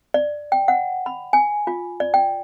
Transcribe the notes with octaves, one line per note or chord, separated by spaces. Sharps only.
D5
G5
F#5
B5
G#5
F4
D5
G5